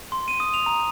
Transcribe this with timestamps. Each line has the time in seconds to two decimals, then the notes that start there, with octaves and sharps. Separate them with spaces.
0.12 C6
0.28 D#7
0.40 D#6
0.54 F7
0.66 A#5